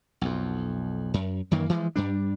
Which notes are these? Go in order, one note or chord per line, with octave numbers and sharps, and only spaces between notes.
B1 F2
F#2
F#2 D#3 E3 A#3
E3 F3 G#3
G2 G3 D4